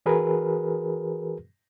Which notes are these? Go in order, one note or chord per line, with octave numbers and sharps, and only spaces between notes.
E3 F#4 G#4 A#4 B4